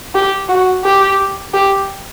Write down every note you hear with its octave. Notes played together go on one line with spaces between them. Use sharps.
G4
F#4
G4
G4